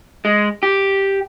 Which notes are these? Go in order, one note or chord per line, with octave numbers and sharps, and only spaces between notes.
G#3
G4